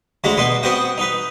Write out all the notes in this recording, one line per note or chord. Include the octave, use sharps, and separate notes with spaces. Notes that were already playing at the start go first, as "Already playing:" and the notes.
D2 G#3 F#4 A#5 B5
B2 B3 B4 C6
B3 C4 F#4 D#5 F#5 G5
D#4 B4